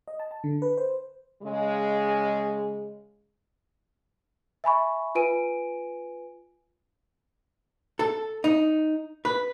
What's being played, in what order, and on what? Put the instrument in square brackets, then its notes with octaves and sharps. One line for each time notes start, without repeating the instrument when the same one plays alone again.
[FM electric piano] D#5
A5
A5
D3
B4
C5
[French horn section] C#3 G#3
[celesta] E5 G#5 B5 C#6
F4 B4 G#5 D7 D#7
[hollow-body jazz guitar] A4
D#4
B4